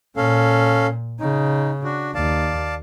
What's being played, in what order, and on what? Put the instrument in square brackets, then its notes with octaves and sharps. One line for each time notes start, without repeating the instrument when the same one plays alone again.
[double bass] A#2 [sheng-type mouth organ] C#4 A4 F5
[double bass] C#3 [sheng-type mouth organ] D#4
[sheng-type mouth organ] D4 F#4
[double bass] D#2 [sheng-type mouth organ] D5 F5 A5